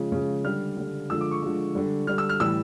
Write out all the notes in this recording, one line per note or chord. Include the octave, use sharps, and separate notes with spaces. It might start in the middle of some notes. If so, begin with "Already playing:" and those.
Already playing: C#3 F3 G#3
C#3 F3 G#3
D3 G3 F6
D3 G3
D3 F3 G#3 E6
D6
C#6
D3 F3 G#3
D3 G3
D3 G3 F6
E6
F6
A2 E3 G3 E6